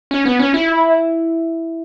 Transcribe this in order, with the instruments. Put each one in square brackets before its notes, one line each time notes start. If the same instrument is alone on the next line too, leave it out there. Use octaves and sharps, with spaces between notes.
[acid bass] C#4
B3
C#4
E4